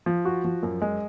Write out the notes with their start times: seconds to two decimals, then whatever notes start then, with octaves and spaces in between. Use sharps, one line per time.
0.06 F3
0.25 F#4
0.44 F3
0.63 F#2
0.82 G#3